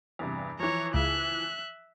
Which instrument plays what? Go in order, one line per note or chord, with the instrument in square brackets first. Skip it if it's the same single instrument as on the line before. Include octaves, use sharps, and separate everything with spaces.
[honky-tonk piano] E2 G2 C3
[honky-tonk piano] E3 F3 [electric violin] C#5 A#5
[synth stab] C#2 [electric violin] E5 F#6